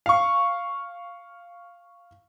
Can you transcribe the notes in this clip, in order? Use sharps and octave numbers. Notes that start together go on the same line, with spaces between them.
F5 C#6